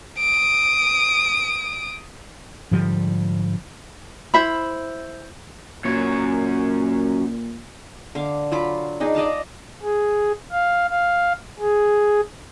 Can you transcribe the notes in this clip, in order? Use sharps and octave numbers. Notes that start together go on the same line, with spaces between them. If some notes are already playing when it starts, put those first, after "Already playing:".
D#6 D7
G#2 D3 F3 G3
E4 C5 E5 B5
F#2 A#2 C#5
D3 F5 D6
F#3 F4 B5 D6
D4 D#4 G#4
D5 D#5 F5 A5
G#4
F5
F5
G#4